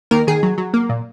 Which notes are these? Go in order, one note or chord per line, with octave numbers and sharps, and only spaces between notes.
D#3 A#3 A#4
D#3 G#4
F#3
F#3
A#3
A#2